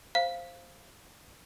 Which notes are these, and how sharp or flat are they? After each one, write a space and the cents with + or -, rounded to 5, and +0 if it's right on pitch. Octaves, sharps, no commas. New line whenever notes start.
C5 +5 F5 -10